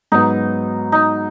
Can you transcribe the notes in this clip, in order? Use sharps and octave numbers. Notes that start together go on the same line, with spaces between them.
G#2 F#3 B3 D#4 F#4
D#4